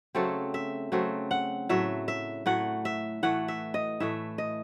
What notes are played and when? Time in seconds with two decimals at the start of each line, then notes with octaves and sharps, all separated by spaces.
0.15 C#3 F#3 A3 C4 A4
0.54 E5
0.92 C#3 F#3 A3 C4
1.31 F#5
1.69 A2 F#3 A3 E5
2.08 E5
2.46 A2 F#3 A3 F#5
2.85 E5
3.23 A2 E3 A3 F#5
3.48 E5
3.74 D#5
4.00 A2 E3 A3 E5
4.38 D#5